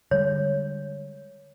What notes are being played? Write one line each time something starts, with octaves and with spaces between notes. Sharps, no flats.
D3 G3 G#3 C#5